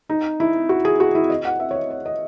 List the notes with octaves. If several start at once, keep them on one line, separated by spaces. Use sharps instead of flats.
D#4
E4
F#4
G#4
F#4
E4
D#5
F#5
E5
C#5
D#5
C#5
D#5